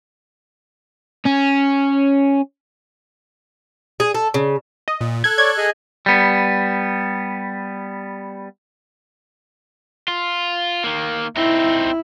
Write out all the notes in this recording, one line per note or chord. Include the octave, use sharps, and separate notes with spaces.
C#4
G#4
A4
C#3
D#5
A#2
A4 F#6 G#6
C#5 D5 G#6
G#4 D#5 G#5
G3 B3
F4
D#3 A#3
C4 D#4 E4